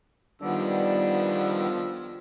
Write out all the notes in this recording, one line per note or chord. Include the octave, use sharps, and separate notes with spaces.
D#3 F3 G3 B3 D4 E6